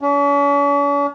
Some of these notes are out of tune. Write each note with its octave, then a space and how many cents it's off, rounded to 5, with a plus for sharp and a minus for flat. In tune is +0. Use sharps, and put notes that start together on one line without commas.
C#4 +45